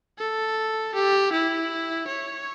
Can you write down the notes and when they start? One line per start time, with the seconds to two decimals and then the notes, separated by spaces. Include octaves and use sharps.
0.19 A4
0.95 G4
1.32 E4
2.08 C#5